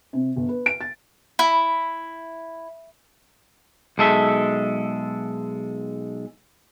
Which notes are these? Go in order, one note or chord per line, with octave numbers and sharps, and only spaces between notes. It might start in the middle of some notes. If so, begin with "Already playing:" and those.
C3
G1
B4
D7
A6
E4
B1 G#3 A4 E5